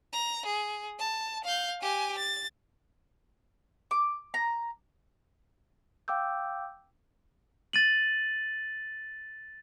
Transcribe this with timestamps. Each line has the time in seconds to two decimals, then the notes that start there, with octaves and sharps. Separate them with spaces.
0.13 A#5
0.46 G#4
0.99 A5
1.44 F5 G6
1.81 G4 G#5
2.18 A6
3.91 D6
4.34 A#5
6.08 F5 G5 D6 E6 G6
7.73 A6 D#7 F#7